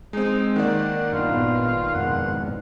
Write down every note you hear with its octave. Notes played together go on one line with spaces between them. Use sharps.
G#3 C4 D#4
D#3 A#3 D5 F#5
G2 B3 D4 F4
G#1 A#2 B3
F2 G#2 B2 F#5